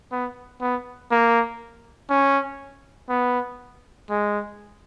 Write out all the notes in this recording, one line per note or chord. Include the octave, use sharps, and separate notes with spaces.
B3
B3
A#3
C#4
B3
G#3